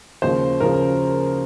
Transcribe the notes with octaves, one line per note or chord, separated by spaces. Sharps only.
D#2 C#3 F3 C5
C#3 F3 A#4